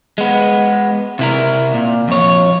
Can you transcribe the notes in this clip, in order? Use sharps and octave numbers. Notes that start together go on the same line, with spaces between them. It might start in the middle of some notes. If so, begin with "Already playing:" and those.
G#3 B3
C3 E4 A#4
A#2
F2 C#5